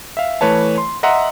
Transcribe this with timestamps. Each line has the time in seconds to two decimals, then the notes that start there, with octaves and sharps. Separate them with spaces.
0.17 E5 F5
0.41 E3 A3 B4 C#5 A5
0.78 C6
1.03 D#5 E5 F#5 A#5 C6